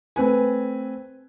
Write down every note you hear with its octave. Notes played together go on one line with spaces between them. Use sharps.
A3 C4 B4 G#5